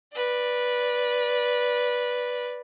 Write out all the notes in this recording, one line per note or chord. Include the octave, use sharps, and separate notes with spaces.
B4 D5